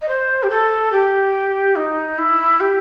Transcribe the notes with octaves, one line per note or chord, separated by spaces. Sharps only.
D#5
C5
G4
A4
G4
D#4
E4
G4